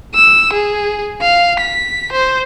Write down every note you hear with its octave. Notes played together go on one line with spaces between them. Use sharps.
E6
G#4
F5
B6
C5